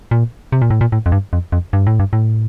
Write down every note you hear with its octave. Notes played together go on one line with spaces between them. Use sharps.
A#2
C3
A#2
A2
A#2
A2
F2
G2
F2
F2
G2
A2
G2
A2